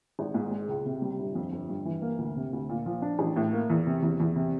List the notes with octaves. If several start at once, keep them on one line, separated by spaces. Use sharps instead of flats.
G#1
G#2
G#3
C#2
C3
G3
G1
F2
G1
G2
E3
A#3
D2
C3
D2
A#2
F3
D4
A1
A2
A#3
E2
C3
E2
E2
C3